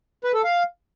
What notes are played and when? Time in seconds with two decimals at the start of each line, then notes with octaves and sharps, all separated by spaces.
0.24 B4
0.34 A4
0.44 F5